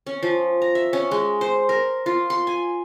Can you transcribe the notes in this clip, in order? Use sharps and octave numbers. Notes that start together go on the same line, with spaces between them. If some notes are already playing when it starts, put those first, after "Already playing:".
C#4
F3
A#5
E5
C#4
G#3
C5
A#4
F4
C6
G#5